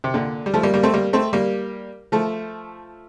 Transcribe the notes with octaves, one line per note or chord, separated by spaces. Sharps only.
C3
A#2 D3
G3
F3 A3
G3 A#3
G3 A#3
A3 C4
G3 A#3
A3 C4
G3 A#3
F3 A3